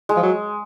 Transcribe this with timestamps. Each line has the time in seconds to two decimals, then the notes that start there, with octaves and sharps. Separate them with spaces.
0.09 G#3
0.16 F3
0.23 F#3